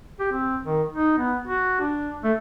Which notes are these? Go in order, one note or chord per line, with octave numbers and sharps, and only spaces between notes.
G4
C4
D#3
D#4
B3
F#4
D4
A3